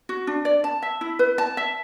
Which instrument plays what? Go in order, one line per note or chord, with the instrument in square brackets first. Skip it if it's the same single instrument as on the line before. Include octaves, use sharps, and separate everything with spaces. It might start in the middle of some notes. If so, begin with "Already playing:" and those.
[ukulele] F#4
D4
D5
A5
E5
E4
B4
A5
E5